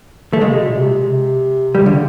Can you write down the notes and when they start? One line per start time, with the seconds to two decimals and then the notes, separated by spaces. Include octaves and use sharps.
0.33 A3
0.41 C#3 G#3
0.50 C3
0.58 B2
0.66 A#2
0.75 C3
1.08 C3
1.74 C#3 G3
1.86 D3